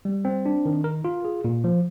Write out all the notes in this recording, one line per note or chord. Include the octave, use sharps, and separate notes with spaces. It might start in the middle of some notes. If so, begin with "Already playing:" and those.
G3
C4
D4
D#3
A#4
F4
G#4
A#2
F3